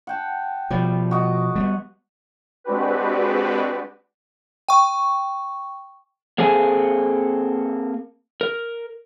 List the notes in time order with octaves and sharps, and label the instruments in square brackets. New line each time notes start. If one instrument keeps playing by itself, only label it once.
[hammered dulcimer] F#5 G5 A5
[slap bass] B2 F3 [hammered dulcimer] G3
[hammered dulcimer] F#4 D#5 D6
[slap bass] G3 A#3 B3
[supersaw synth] G#3 C4 D4 F#4 G4 B4
[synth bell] G5 C#6
[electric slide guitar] A#3 C4 G#4 A4 G#5
A#4